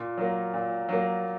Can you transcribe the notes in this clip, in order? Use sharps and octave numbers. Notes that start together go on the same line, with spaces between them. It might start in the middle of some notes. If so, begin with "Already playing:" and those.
Already playing: A#2
F#3 A#3
A#2
F#3 A#3